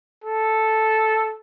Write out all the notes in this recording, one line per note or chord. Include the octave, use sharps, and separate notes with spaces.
A4